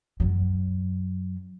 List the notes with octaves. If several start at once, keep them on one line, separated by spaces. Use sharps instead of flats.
F#2 F#3